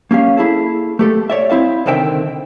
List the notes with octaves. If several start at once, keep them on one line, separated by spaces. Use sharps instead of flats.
A#3 C#4 G4 F5
A#3 E4 G#4 A4
A3 G4 A4
C#5 D5 E5
C4 E4 E5 F5
C2 D3 D#3 C4 E5 G5